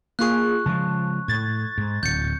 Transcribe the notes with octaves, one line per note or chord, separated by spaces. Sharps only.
A#3 F4 G#4 C#6 F#6
C#3 F3 G#3 A5
A2 G#6 A6
G#2
D1 G6 C#7